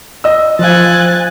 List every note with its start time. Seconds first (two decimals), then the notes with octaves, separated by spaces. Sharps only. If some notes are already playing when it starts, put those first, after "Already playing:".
0.24 D#5 E6
0.59 F3 C5 F5 G#5 F#6 A6